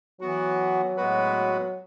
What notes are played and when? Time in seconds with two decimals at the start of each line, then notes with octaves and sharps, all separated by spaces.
0.21 E3 F#3 B3 F#4
0.97 A2 G#3 B3 F#4 B4